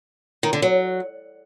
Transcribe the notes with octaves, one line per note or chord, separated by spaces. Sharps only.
D#3
D3
F#3